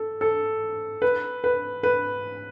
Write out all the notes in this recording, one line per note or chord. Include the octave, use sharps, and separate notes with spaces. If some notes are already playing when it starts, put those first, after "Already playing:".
Already playing: A4
A4
B4
B4
B4